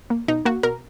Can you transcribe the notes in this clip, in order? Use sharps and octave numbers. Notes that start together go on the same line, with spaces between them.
A#3
B2 D#4
A#3 F#4
B2 A#4